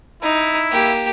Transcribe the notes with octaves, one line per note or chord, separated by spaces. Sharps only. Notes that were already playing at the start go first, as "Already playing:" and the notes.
D#4 E4
A#3 G4